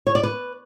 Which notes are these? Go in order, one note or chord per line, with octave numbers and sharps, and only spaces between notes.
C#5
D5
B4